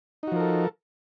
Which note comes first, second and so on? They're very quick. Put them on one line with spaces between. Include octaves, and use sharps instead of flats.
D#4 F#4 F3 A#4 A4